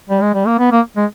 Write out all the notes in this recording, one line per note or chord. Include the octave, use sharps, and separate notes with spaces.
G3
G#3
G3
A#3
B3
A#3
G#3